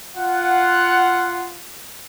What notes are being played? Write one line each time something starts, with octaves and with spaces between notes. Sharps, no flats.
F4 F#5